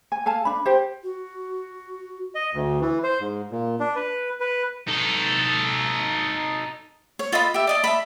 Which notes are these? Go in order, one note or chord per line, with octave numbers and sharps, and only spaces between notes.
G#5
A4 F5 G#5 A5
D4 B5
G4 C5
F#4
D#5
D2
E3
C5
G#2
A#2
D4
B4
B4
D#4 A4
C#5
F4 A4 D#5 B5
G4 E5
D5 D#5 A5
E5 A5 B5